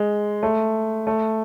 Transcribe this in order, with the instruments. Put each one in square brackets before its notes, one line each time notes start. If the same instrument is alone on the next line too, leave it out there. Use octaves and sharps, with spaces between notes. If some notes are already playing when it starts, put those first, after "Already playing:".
Already playing: [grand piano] G#3
A3
A3